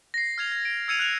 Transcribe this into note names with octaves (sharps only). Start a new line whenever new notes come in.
A#6 C7
F6 G#6 F7
G#6
D7
E6 G#6 C#7 D#7 F7
F#6 F7